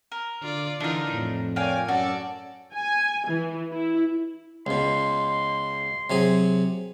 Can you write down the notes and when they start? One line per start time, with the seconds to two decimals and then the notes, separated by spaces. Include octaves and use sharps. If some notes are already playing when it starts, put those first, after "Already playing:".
0.12 A#4
0.42 D3 F4 D5
0.80 D3 E3 D4 D#4 F4 A#4
1.13 F2 A2
1.56 A#4 C#5 D5 F5 G5 G#5
1.88 F#2 C#4 F#4 A4 D5
2.74 G#5
3.28 E3
3.71 E4
4.67 C#2 B2 C6
6.10 C3 F#3 G#4